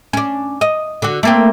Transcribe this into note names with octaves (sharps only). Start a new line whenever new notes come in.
C#4 D4
D#5
D3 F#4
A3 A#3 C4